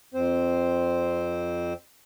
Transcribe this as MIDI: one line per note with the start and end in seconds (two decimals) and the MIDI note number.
0.14 1.73 41
0.14 1.73 60
0.14 1.73 72